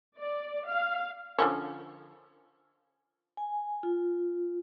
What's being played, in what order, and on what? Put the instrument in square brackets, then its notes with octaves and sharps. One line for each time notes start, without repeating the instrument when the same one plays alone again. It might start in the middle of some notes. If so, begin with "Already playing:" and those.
[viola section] D5
F5
[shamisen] D3 F3 C#4
[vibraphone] G#5
F4